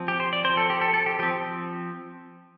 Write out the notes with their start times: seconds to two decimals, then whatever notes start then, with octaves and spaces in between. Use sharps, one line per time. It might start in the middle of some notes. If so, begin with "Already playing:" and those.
Already playing: F3 C4
0.08 G4
0.20 C5
0.33 D5
0.44 C4 C5
0.50 F3
0.57 A4
0.70 G4
0.81 A4
0.94 A4
1.06 G4
1.19 F3 C4 G4